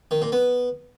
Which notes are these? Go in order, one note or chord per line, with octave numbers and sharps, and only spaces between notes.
D#3
A#2
B3